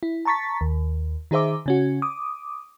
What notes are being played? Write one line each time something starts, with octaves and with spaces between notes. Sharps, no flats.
E4
A5 A#5 C#6 A6 B6
D#2
D#3 D#4 G#4 C5 E5 D6
C#3 C#4 F#4
D6 D#6